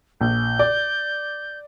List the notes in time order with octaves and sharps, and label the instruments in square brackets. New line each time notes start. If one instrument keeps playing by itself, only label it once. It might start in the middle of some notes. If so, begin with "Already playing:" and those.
[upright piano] A#1 [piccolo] G6
[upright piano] D5